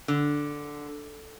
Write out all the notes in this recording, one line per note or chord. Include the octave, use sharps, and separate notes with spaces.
D3